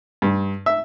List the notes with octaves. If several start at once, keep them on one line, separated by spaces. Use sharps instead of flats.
G2
E5